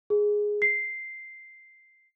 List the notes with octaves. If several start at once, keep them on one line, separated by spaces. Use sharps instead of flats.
G#4
C7